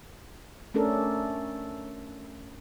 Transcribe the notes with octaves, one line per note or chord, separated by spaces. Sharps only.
A3 C#4 D4 A4 A#4